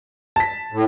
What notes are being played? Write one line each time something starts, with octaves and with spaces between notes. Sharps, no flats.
A5 B6
A2